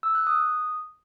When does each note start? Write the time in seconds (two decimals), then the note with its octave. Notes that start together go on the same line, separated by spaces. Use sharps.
0.03 E6
0.15 F#6
0.27 D#6